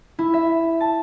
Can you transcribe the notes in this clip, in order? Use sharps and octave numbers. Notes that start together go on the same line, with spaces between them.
E4
E5
A5